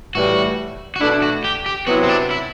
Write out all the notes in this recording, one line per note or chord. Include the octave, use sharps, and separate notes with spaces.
A2 E3 G3 F#4
F#4
B2 A3 D4 E4
F#4
G4
G4
C3 F#3 B3 E4 F#4
C4
D4
E4